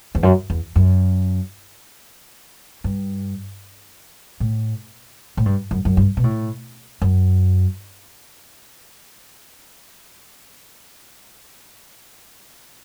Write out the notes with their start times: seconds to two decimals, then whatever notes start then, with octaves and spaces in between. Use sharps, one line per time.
0.15 E2
0.23 F#2
0.50 E2
0.76 F#2
2.84 G2
4.40 A2
5.37 A2
5.46 G2
5.71 F#2
5.85 F#2
5.97 G2
6.17 B2
6.24 A2
7.02 F#2